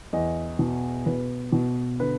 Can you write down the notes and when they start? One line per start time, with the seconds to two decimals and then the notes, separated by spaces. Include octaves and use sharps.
0.13 E2 D#5
0.59 B2
1.06 B2 B4
1.52 B2
2.00 D3 B4